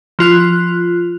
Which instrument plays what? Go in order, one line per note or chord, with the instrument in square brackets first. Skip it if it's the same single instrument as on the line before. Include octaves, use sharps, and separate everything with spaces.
[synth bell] F3 F4 F#6